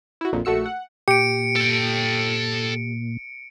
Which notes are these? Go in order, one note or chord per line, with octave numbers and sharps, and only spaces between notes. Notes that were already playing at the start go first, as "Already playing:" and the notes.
E4 F#4
A#1 F2 A#2
A#1 A3 F#4 E6 C#7
F#5
A#2 G4 C#7 D7
A4 G5